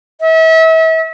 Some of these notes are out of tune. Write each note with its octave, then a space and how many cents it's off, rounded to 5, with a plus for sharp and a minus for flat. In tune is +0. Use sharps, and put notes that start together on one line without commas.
E5 -35